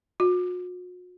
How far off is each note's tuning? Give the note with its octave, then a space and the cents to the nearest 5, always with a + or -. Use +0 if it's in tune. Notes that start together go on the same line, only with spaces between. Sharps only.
F#4 -45